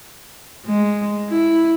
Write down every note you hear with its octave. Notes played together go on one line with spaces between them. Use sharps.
G#3
E4